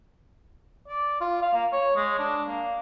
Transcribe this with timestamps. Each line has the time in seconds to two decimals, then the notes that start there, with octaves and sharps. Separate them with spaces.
0.88 D5
1.21 F4
1.42 F5
1.54 A#3
1.72 C#5
1.96 G#3
2.19 D4
2.48 A#3